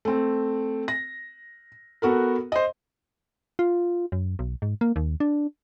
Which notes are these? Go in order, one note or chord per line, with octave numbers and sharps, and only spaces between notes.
A3 C4
A#6
B3 F#4 A4 A#4
C5 D#5
F4
F#2
B1
G#2
A#3
D#2
D4